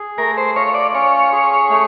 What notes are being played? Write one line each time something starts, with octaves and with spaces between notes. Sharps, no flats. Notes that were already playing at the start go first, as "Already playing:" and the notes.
Already playing: G#4
A3 A#4
C5
F4 C#5
D5
C#4 C#5
G#4
A3